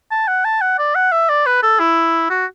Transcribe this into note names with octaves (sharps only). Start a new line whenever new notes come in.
A5
F#5
A5
F#5
D5
F#5
E5
D5
B4
A4
E4
F#4